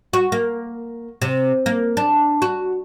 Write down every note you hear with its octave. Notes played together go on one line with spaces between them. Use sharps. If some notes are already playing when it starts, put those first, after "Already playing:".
F#4
A#3
C3
A#3
D4
F#4